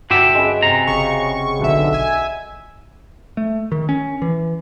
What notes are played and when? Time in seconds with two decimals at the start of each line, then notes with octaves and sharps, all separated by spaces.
0.10 G2 D3 F#4 G4 E5
0.35 G#3 C#4 B4
0.62 C3 A#5
0.87 G1 C#3 C#6
1.59 B1 D3 E5
1.93 A#1 E5 G#5
3.37 A3
3.72 D#3
3.89 C#4
4.22 E3